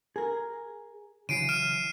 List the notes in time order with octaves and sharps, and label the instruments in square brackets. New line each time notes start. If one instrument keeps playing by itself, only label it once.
[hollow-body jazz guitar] G#4 A#4
[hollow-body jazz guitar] C#3 E3 F#3 [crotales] C7 D7 D#7
[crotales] F6 D7 E7